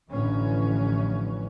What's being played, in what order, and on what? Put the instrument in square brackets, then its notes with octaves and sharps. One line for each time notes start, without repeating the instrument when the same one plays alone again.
[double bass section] A1 F2 D3 E3 C#4